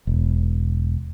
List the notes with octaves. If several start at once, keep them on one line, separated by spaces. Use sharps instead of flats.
E1